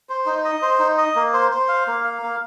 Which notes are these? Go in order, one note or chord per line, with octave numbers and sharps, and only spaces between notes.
C5
D#4
D#5
C5
D#4
D#5
A#3
C5
C5
F5
A#3
F5
A#3